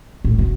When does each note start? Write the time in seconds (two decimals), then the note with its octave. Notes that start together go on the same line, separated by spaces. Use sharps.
0.24 A2
0.39 B2